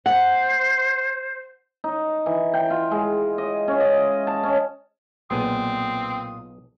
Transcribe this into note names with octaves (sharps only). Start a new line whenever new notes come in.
C5 F#5
D#4
E3
G5
F4
G#3
D#5
C#4
D#5
A5
C#4
B1 A#2 B3 C4 G#4 D#6